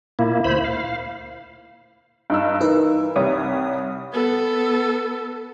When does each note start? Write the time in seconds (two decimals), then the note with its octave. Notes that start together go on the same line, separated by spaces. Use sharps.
0.19 A#2 A#3 E4
0.44 D2 E4 C5 B5
0.64 F5
2.30 G2 D#4 E6
2.61 E3 D#4 A#4 B4
3.16 C2 G3 C#5 D#6
4.13 B3 A4